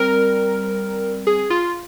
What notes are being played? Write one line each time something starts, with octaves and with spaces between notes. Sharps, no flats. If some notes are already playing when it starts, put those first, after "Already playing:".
Already playing: G3 C4 A#4
G#4
F4